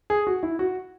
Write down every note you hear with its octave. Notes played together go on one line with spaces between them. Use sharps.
G#4
F#4
E4
F#4